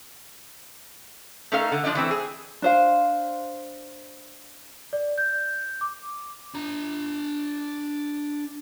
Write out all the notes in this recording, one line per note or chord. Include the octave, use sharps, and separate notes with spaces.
A3 C#4 D#4 A4 A#4 F5
D3
F3 D4 D5 D#5
E3 A3 C4 A4
G#4
D4 C5 F5
D5
G6
D6
D4 A#5